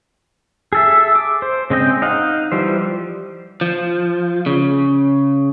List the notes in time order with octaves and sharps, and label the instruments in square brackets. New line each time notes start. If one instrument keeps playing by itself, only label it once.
[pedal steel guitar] G#4 A4 E5
D6
C5
C#3 G#3 C4 D#5 G5
D#4 D#5 F5 F#5
E3 F3 G3 C5
[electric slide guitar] F3
C#3